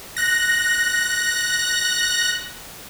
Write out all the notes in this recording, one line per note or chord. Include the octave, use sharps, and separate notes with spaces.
F#6 A#6